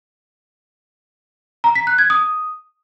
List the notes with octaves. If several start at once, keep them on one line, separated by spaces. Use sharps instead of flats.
A#5
B6
F#6
G#6
D#6